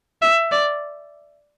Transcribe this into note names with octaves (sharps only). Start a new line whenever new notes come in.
E5
D5